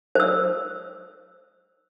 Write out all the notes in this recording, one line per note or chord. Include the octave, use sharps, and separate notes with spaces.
C5 E6